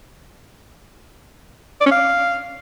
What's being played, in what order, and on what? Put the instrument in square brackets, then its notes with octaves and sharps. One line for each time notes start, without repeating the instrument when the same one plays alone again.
[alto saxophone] D5
C#4
F5